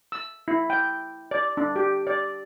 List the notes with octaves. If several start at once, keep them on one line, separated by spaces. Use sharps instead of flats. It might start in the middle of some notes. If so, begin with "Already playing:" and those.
E6
E4
G5
D5
D4
G4
D5